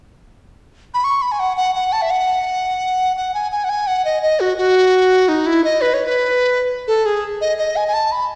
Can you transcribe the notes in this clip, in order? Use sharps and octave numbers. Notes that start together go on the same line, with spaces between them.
B5
C#6
B5
G#5
F#5
F#5
F#5
A5
E5
F#5
F#5
G#5
G#5
F#5
G#5
F#5
D#5
D#5
F#4
F#4
D#4
E4
D#5
B4
C#5
B4
A4
G#4
D#5
D#5
G#5
G#5
A5
B5